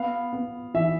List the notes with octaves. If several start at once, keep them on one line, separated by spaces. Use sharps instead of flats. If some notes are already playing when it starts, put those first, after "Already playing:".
Already playing: B3 F5
B3
E3 E5